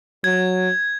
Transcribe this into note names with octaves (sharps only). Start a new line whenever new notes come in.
F#3 G#6